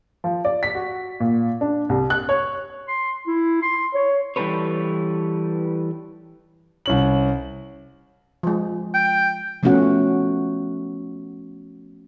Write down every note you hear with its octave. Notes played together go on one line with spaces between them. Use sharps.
F3
D5
B6
F#4
A#2
D4
C2
F#6
C#5
C6
E4
C6
C#5
E3 G3 F#4 A4 B4 C#5
C2 C#4 F#7
F3 G#3
G5
F3 A3 B3 C#4 F#4 F#5